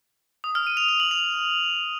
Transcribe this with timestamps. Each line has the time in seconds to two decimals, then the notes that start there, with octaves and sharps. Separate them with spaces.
0.44 D#6
0.55 F6
0.67 D#7
0.77 F7
0.88 F7
1.00 F#7
1.11 F7